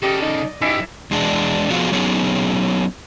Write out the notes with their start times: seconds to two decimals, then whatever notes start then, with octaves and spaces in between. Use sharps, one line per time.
0.03 C#3 G4 A4 D5 D#5
0.22 D#4
0.61 F#2 E3 D#4 G4 E5
1.11 E2 G#3 D4
1.70 F3 B3 F4 F#4 G#4
1.92 F#3 B3 C#4 D#4 G#4